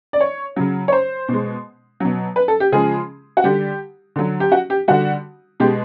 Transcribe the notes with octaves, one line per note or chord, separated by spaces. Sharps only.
D5
C#5
C#3 F#3
C#5
C5
B2 G#3
B2 F#3
B4
A4
G4
C#3 F3 G#3 G#4
F#4
D3 G3 G4
D3 F#3
G4
F#4
G4
D3 G3 F#4
B2 G#3 G4